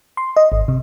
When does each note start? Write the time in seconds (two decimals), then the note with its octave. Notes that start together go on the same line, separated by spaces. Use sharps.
0.17 C6
0.36 D#5
0.52 G#1
0.68 C3